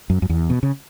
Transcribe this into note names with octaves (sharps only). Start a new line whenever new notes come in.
F#2
F#2
E2
B2
C#3